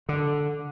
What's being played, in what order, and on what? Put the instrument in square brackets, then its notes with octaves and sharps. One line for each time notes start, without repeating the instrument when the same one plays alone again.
[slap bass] D3